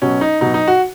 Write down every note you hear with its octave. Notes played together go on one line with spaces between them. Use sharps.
B2 F#3 C#4
D#4
B2 F#3 D#4
D#4
F#4